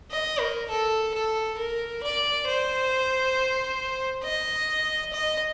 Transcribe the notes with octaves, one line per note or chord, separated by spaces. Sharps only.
D#5
A#4
A4
A4
A#4
D5
C5
D#5
D#5